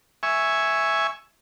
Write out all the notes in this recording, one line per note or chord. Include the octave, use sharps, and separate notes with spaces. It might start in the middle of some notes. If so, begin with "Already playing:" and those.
E5 G#5 C#6